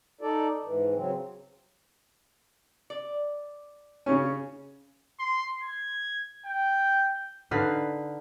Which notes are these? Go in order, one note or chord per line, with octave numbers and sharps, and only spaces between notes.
D#4 A4 D5
G#2 E3
C#3 F#3 C4
D5
C#3 C#4
C6
G#6
G5
D3 D#4 B4 F5